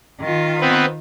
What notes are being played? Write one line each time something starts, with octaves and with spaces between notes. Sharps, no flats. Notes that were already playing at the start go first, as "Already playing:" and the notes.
D#3 F4
B3 C4 B4